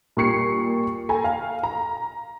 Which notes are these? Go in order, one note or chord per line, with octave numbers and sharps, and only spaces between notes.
A#2 G3 C#6 C7 C#7
A4 G5 G#5 A#5
F5
A#5